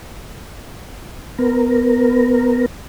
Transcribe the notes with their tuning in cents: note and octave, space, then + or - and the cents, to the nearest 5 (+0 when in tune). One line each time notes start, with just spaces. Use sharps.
B3 +20 A#4 +0